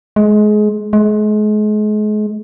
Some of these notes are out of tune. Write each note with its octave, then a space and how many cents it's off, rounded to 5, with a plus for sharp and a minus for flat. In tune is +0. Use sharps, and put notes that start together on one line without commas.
G#3 +25
G#3 +35